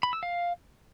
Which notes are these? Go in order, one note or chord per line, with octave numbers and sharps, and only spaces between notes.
B5
E6
F5